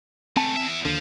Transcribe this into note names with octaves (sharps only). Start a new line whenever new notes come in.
C#2 A3 C4 G#5 A5
E2 E5
D#2 D3 F3